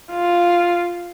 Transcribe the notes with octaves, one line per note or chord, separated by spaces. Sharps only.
F4